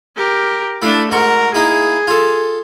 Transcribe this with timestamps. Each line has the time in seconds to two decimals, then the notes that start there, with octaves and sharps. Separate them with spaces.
0.16 G4 A#4
0.82 A3 D4 E4 F5
1.11 G#2 F#4 A#4 C#6
1.54 A#3 D#4 E4 G#4
2.07 F4 A4